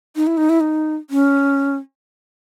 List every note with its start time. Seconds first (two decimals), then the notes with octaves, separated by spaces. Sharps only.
0.16 D#4
0.27 E4
0.37 D#4
0.49 E4
0.60 D#4
1.10 C#4